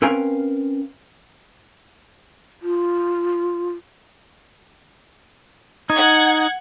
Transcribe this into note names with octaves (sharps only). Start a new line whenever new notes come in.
C4 C#4 A#4 B4 F5 G#5
F4
D#4 F#5 G#6